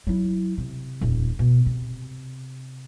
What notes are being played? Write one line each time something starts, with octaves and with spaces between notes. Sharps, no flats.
F#3 E4
C3
D#1 F2
B2
C3